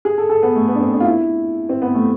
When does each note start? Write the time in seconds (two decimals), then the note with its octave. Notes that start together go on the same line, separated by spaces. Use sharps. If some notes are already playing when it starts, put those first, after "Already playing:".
0.05 G#4
0.18 A4
0.30 A4
0.43 B3
0.55 A3
0.68 B3
0.75 D4
0.81 C4
0.93 D4
1.00 F4
1.06 E4
1.69 C4
1.82 B3
1.94 A3